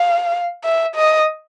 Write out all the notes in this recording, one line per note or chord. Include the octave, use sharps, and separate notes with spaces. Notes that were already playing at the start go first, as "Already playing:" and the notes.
Already playing: F5
E5
D#5